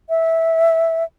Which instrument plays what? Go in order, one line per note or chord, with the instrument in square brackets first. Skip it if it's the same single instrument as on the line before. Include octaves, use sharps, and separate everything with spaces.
[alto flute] E5